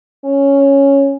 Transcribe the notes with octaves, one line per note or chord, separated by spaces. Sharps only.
C#4